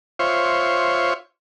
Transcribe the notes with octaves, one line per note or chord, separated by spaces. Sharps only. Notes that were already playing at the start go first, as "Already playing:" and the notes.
F4 C5 C#5 E5 F5 C#6